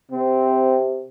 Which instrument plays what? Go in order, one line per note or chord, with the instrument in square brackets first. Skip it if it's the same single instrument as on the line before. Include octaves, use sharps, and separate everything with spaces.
[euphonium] C3 [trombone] C4